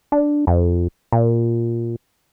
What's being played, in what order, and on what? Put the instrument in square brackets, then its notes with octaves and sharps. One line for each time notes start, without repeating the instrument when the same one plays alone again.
[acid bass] D4
F2
A#2